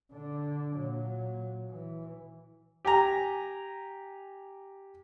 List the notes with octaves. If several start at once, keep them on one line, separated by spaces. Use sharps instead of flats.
D3 D4
A#2 F#3
E3
G4 G#5 A#5